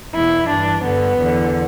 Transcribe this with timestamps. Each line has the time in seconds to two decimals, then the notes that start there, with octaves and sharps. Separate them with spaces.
0.13 E2 B2 E4
0.48 G2 E3 D4
0.83 G2 D3 B3
1.19 E2 D3